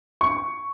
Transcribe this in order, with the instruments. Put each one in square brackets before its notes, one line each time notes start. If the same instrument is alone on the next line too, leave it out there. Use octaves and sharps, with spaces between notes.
[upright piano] C#6